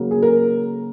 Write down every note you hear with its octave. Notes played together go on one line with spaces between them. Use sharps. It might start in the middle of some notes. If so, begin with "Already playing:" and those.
Already playing: C#3 F#3 A#3
G#4
A#4